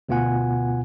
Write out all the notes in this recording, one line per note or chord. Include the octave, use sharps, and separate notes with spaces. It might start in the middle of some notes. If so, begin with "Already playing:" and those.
D2 B2 B3 F4 F#5 G#5